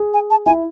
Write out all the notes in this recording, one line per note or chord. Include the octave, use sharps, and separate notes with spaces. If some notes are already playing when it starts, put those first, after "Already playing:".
Already playing: G#4
G#5
A5
E4 G#5